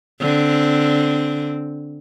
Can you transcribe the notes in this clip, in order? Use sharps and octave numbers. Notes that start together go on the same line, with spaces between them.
D3 C4